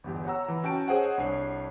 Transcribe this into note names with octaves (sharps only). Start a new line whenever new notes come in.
G1 E2 G4
C#5 F#5 A#5 E6
E3 A#5
C#4 F#4 G5 A5 D7
G#4 C5 C#5 D#5 F#5 G#5
C2 D4 C#5 C7